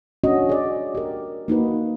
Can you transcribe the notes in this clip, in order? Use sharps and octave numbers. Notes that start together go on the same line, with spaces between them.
C#4 D4 F#4 D#5
G#4 D5
G4 A#4
A#3 D#4 F#4 B4